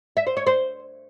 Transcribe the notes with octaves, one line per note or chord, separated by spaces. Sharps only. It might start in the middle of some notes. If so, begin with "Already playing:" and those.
E5
C5
C#5
C5